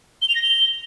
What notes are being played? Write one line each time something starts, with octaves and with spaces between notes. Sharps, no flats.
G7
F7
A#6
G7